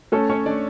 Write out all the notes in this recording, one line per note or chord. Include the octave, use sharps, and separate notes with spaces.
A3 C#4 A4
C#4 C#5
A3 D4 D5